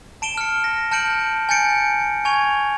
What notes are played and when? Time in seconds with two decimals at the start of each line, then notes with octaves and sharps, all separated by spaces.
0.22 A5 D7 E7 G7
0.38 F6 C#7
0.64 A#6
0.91 A5 F6 G6 C#7 D7 F#7
1.49 G#5 A5 G6 A6 C#7 D7
2.25 G#5 C#6 G#6 F7